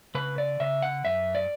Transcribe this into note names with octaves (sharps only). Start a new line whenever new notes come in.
C#3 B4
D5
C#3 E5
F#5
F#2 E5
D5